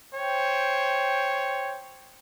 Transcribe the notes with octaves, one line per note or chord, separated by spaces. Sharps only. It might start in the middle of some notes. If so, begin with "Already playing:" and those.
C5 C#5 G5